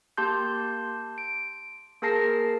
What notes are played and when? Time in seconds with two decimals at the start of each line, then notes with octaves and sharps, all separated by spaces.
0.17 A#3 G4 A5 C6 G6
1.18 D7
2.02 A#3 G#4 A#4 A5 A#6 C7